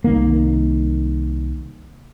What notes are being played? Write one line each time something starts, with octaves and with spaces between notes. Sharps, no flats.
C2 D#3 A#3